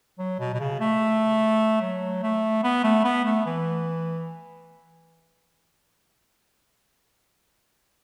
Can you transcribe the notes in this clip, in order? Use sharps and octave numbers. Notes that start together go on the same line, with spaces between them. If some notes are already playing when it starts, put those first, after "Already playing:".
F#3
B2
B2
C#3
A3
F#3
A3
B3
A3
B3
A3
E3